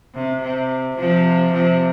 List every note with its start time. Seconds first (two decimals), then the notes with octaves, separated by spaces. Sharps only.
0.14 C3
0.42 C3
0.97 C3 F3
1.53 C3 F3